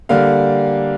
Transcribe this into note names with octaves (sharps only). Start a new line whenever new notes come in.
D3 G3 A#3 F5